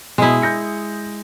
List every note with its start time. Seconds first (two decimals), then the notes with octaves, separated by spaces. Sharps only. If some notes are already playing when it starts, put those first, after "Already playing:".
0.18 B2 G#3 E4 D#6
0.42 G6 A#6 C#7